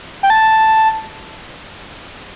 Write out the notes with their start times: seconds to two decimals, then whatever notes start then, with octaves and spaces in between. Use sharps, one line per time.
0.23 G5
0.30 A5